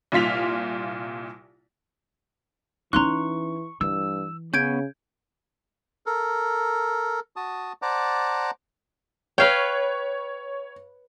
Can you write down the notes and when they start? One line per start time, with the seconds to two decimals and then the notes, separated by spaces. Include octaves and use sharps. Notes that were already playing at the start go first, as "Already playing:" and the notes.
0.12 C2 A#2 F4 B6 F7
2.93 E3 C#4 D#4 A#5 C6 C#6 F#6
3.81 G2 E3 E6
4.54 C#3 B3 C#4 G6 G#6 D7
6.06 A4 A#4
7.36 F#4 A5 D#6
7.82 C5 D5 F#5 A5 A#5 D6
9.38 B4 C#5 F5 G5